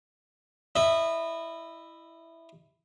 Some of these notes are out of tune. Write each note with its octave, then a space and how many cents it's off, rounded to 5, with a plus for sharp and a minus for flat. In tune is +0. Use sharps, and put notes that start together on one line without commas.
E4 +0 D#5 -25